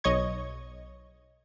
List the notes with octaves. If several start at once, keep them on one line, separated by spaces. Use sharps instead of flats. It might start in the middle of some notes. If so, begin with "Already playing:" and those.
B1 C#5 D#5 C#6 G#6